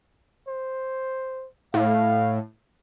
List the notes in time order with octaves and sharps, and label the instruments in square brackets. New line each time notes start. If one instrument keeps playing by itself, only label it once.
[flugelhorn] C5
[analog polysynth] A2 [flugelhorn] F5